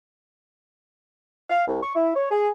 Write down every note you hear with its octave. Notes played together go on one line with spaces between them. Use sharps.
F5
C2
C#6
E4
C#5
G#4